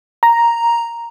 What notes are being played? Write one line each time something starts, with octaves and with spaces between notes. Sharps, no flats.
A#5